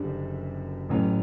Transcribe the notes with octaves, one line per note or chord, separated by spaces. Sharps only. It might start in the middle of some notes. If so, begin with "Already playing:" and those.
Already playing: F#1 F#2 D3 G3 D4
A1 A2 F#3 C#4